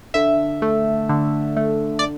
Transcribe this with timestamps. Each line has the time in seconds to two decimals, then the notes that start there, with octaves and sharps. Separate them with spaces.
0.14 D3 E5
0.62 A3
1.09 D3
1.57 A3
1.99 D5